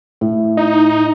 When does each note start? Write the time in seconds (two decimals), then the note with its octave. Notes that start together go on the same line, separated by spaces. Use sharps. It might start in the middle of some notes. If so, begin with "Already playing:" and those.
0.21 A2
0.57 D#4